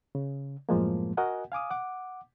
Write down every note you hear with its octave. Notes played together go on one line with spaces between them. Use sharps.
C#3
F#2 A2 F3 G#3 A#3
F#4 A#4 D#5 F#5 G#5
F5 G#5 D6 D#6
F#5 D6